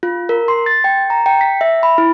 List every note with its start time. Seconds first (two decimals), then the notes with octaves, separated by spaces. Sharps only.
0.03 F4
0.29 A#4
0.48 C6
0.66 A6
0.84 G5
1.10 A#5
1.26 G5
1.41 B6
1.61 E5
1.83 B5
1.98 E4